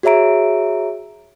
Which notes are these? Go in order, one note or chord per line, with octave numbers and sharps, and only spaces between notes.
F#4 G#4 C#5 E5 A#5 D7